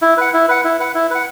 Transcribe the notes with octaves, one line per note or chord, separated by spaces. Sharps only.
E4
B4 F#5
E4
B4 F#5
E4
B4 F#5
E4
B4 F#5